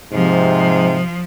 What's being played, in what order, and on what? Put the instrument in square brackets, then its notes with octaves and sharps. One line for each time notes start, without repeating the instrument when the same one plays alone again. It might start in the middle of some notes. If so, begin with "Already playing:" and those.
[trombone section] G#2 C3 [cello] F3